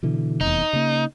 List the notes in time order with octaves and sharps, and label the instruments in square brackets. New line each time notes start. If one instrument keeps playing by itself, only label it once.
[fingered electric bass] B2 D3 E3
[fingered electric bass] F1 E2 [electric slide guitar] D#4
[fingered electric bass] C#3 A#3